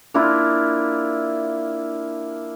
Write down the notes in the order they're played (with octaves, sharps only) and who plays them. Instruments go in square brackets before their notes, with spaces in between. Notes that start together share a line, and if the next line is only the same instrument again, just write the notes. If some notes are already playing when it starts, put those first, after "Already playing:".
[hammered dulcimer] A#3 D4 E4 F4